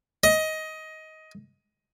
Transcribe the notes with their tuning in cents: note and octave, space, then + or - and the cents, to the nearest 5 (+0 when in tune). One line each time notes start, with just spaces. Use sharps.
D#5 +15